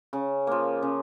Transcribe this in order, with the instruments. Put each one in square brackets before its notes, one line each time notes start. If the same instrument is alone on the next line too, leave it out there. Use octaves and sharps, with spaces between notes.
[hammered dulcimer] C#3
F3 A#3
C#3